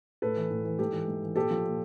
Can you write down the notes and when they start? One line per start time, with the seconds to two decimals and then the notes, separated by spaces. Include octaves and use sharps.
0.22 A2 A4 B4
0.36 E3
0.50 A2
0.65 E3
0.79 G#2 G4 A4
0.93 E3
1.08 G#2
1.22 E3
1.36 A#2 G4 A4
1.51 F3
1.64 A#2